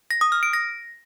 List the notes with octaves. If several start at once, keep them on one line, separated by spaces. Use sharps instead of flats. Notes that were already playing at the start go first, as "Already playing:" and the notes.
A#6
D#6
F6
D7
A#6